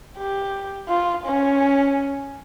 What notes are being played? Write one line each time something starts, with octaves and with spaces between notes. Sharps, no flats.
G4
F4
C#4